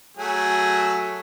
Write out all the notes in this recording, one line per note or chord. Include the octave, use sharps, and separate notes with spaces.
F#3 A3 G#4